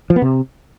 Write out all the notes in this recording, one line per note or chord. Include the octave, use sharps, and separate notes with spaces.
F3
B3
C3